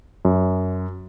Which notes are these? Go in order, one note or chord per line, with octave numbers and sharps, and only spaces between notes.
F#2